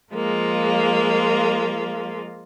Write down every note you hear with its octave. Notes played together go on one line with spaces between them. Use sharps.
F3 G#3 A#3 F4